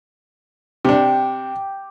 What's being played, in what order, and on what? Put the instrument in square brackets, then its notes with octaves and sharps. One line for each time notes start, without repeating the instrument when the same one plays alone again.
[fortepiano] C3 D4 [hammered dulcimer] G4